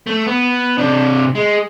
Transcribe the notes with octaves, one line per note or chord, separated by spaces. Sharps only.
A3
B3
C3 D4
G#3